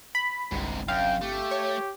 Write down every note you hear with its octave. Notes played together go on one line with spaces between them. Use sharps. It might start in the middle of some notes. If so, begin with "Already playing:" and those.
B5
G1 C2 G#2 C3
F#2 F5 G5
A3 G4
C#5